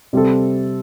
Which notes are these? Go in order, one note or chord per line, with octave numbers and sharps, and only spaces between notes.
C3 G3 C4 A4